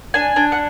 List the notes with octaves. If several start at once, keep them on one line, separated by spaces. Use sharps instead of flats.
D4 G#5
D4
F#5